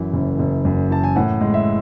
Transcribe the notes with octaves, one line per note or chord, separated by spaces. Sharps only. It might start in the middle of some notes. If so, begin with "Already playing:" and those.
Already playing: F#2 E3
F#1
F#1
F#2
E3 A5
G#5
A2 F#5
G#3
E5